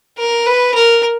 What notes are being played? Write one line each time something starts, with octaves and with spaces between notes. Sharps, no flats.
A#4
B4
A#4